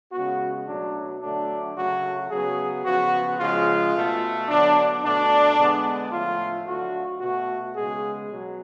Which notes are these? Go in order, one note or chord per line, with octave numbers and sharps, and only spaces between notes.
C#3 G#3 B3 F#4
B2 F#3 A3 D4
D3 F#3 A3 D4
C#3 F#3 A3 F#4
C#3 F#3 B3 G#4
C#3 F3 B3 F#4
C#3 F3 G#3 F4
B2 A3
D3 F#3 B3 D4
B2 A3 D4
D3 G#3 B3
A2 F3 A3 F4
D3 F#3 A3 F#4
B2 A3 F#4
C#3 G#3 B3 G#4
B2 F#3